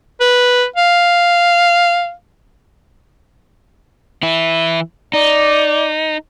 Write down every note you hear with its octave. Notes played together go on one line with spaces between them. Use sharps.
B4
F5
E3 E4
D#4 D5